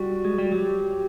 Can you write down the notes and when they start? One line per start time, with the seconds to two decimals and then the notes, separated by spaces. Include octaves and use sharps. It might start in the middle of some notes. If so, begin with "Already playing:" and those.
Already playing: G3 F#4
0.25 G#3
0.38 G3
0.52 F#3 G4